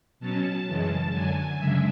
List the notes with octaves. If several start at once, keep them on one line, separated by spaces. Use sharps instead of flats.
B2 F#3 C#4 A5
F#2 C#3 E3 G#3
F#2 D3 F#3 G#5
F#2 C#3 G#3 D4 E5